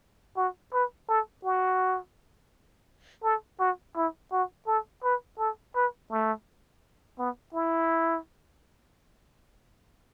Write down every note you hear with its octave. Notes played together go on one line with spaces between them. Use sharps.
F#4
B4
A4
F#4
A4
F#4
E4
F#4
A4
B4
A4
B4
A3
B3
E4